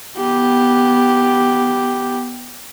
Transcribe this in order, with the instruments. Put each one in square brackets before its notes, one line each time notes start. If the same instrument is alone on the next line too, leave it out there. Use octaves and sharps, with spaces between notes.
[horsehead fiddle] B3 G4